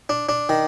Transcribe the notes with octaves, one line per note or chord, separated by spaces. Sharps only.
D4
D4
D#3